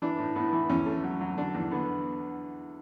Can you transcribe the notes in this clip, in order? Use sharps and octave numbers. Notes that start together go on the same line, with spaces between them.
E3 D4
A2
A2 B3
E3
E2 C#4
A3
F#3
F#3
D3 D4
E2
D3 B3